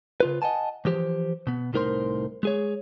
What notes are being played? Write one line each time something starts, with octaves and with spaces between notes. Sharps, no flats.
C#3 F4 B4
D#5 F#5 G#5 A5
E3 F3 G4 C5
B2 B3
C2 A2 D#4 A#4 C5 C6
G#3 G#4 C#5